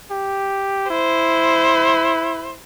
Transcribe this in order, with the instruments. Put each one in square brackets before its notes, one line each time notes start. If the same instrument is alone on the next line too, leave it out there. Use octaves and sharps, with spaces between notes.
[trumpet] G4
[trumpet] E4 [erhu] C5